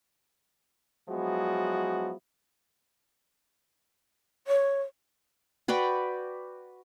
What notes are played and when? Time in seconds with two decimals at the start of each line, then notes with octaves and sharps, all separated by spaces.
1.09 F3 F#3 G#3 B3 E4 F#4
4.47 C#5
5.68 F#4 B4 D5 G5